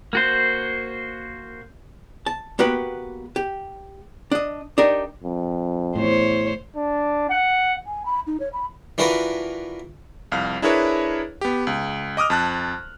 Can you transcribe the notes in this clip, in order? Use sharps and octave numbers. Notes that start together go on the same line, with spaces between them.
A#3 F#4 C5
A5
A#3 B3 F#4 G4 B4
G4
D4 D#5
D4 D#4 G4 A#4
F2
E2 A2 C5 C#5
D4
F#5
G#5
B5
D#4
C#5
B5
E3 D4 F4 F#4 A#4 B4
C2 F2 F5 F6
D4 E4 G#4 A#4 B4 C#5
B3 G4
C#2
D#5 D6 D#6 F6
F2 A5 F#6